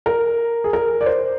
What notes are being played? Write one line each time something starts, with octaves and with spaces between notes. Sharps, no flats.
A#4
G#4
A#4
D5
C5